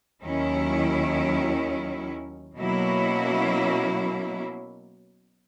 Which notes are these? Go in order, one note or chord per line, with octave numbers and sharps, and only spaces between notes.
D#2 D#3 F#3 C#4 E4
B2 F#3 A#3 C#4 E4